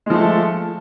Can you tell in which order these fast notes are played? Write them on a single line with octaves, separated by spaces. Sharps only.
G#3 F3 A3 A4